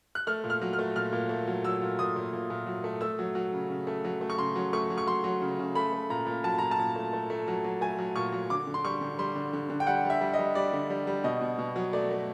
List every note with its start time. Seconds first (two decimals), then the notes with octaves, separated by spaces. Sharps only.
0.15 F#6
0.27 A3 F6
0.44 A#2
0.50 F6
0.61 F#3
0.73 F6
0.79 A3
0.95 A#2 F6
1.13 A#2
1.29 A3
1.47 F#3
1.64 F#3 E6
1.81 A#2
1.99 A#2 D#6
2.16 A#2
2.33 A#2
2.50 A#2
2.66 F#3
2.84 A3
3.01 A3 E6
3.19 F#3
3.35 F#3
3.53 C#3
3.70 C#3
3.87 A3
4.05 F#3
4.21 A3
4.30 C#6
4.38 C#3 C6
4.55 F#3
4.73 A3 C#6
4.90 F#3
4.98 C#6
5.07 F#3 C6
5.24 F#3
5.41 C#3
5.59 C#3
5.75 A3 B5
5.93 A3
6.10 A#2 A#5
6.26 A#2
6.44 F#3 A5
6.58 A#2 A#5
6.71 A5
6.78 A#2
6.96 A3
7.13 A3
7.30 A3
7.48 F#3
7.64 F#3
7.81 A3 G#5
7.99 F#3
8.16 A#2 C#6
8.32 F#3
8.50 D3 D6
8.67 D3
8.74 C6
8.85 G3 C#6
9.01 D3
9.19 G3 C6
9.35 D3
9.53 D3
9.70 D3
9.80 G5
9.87 G3 F#5
10.05 G3
10.10 E5
10.21 G3
10.33 D#5
10.39 G3
10.55 G3 D5
10.73 D3
10.90 G3
11.07 G3
11.24 B2 D#5
11.41 B2
11.59 B2
11.76 F#3
11.93 A3 D5
12.11 A3